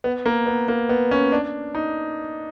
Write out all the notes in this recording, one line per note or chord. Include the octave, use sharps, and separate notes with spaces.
B3
A#3
B3
A#3
B3
C#4
D4
D#4